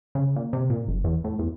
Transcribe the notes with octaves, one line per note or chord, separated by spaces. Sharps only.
C#3
A#2
C3
A#2
F#1
E2
A2
E2